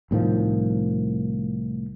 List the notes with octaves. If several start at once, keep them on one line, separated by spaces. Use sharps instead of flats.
C2 A2 D#3 F3